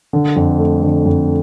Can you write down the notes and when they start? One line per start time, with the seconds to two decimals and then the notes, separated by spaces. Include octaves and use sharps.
0.13 D3
0.36 F2
0.59 A3
0.83 D3
1.06 F2